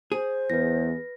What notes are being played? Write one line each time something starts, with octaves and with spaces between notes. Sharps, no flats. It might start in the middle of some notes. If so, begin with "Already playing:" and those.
G#4 C5
E2 B4 A#6